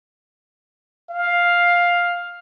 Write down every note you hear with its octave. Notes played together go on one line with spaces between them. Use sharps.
F5